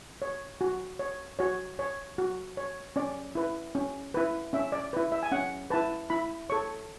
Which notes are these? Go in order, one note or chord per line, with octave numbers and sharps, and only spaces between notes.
C#5
F#4
C#5
F#4 C#5
C#5
F#4
C#5
C#4 D5
E4 B4
C#4
E4 B4
C#4 E5
D5
E4 B4
E5
G#5
C#4 F#5
E4 B4 A5
E4 B5
A4 C#5 C#6